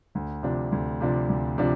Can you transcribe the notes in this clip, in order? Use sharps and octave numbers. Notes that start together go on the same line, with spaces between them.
D2
C3 F3 D4
D2
C3 F3 D4
D2
C3 F3 D4